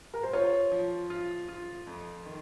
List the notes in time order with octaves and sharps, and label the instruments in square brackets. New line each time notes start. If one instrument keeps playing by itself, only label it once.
[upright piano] A#4
C5
[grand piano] F4 [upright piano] C#5
[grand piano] F3
F4
F4
F2
D#3